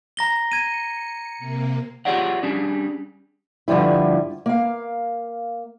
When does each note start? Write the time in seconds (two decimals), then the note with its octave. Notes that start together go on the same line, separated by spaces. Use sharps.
0.17 A#5 A#6 G7
0.52 G#6 C#7 D#7
1.38 C3 A#3
2.05 F4 G4 G#4 C#5 D5 F#5
2.43 G3 C#4 D4 G#4
3.68 G2 D3 F3 G3 E4
4.46 A#3 F5